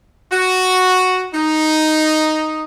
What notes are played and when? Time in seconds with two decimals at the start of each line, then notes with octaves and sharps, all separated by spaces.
0.32 F#4
1.34 D#4